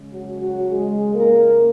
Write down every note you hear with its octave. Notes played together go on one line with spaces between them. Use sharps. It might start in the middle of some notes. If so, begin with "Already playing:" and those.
Already playing: C#3 G#3
F#3 F#4
F#3 F#4
G#3 G#4
A#3 A#4